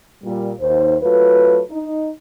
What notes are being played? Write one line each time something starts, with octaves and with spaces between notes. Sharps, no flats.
A#2 G3
D#2 C5
F#3 A3 F4 B4
D#4